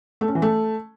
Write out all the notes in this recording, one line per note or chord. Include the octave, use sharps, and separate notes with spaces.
A3
C#4
E3
A3